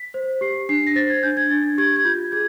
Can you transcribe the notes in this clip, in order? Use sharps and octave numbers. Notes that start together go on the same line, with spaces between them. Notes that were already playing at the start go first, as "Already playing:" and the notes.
Already playing: B6
C5
G4 C7
D4 C7
A#6
C5 A6
G#6
D4 G6
G#6
D4 A6
G4 G#6
G#6
F4 G6
G#4 G#6